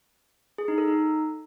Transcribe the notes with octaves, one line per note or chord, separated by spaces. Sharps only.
G#4
D#4
A4
D#4